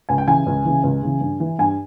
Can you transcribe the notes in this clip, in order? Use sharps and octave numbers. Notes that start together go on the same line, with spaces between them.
C#2 G#5
G5
C#3 E3 G#5
C#2
C#3 E3
C#2
C#3 E3
G2
E3
G2 G#5